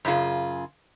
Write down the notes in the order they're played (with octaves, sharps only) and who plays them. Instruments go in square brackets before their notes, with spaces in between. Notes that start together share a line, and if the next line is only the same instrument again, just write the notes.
[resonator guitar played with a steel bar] F#2 C#3 F4 G#4